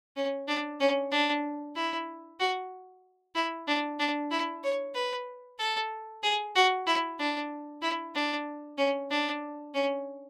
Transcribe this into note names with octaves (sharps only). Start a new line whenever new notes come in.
C#4
D4
C#4
D4
E4
F#4
E4
D4
D4
E4
C#5
B4
A4
G#4
F#4
E4
D4
E4
D4
C#4
D4
C#4